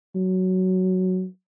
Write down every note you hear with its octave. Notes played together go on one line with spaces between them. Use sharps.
F#3